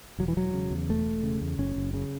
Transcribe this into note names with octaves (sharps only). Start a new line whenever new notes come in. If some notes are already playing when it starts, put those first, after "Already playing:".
E1 F#3
E3
E1 F#3
C#3
E2
E1 A3
E1
C#3
E2
F#1 C#4
F#1
C#3